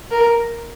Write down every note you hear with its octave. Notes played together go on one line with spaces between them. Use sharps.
A#4